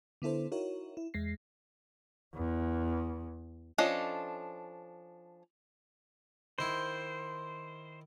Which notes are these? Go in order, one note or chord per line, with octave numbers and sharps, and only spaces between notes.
D3 B3 E4 A4 C5
D#4 E4 F#4 A#4 C#5
E4
E2 G#3 A#6 C7
E2
F3 C#4 D4 A4 D#5
D#3 E4 C5